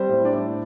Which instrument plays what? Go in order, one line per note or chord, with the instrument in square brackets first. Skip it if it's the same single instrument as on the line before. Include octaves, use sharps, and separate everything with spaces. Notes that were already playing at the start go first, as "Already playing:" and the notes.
Already playing: [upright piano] G3 C4 C5
A2
D4 D5
A2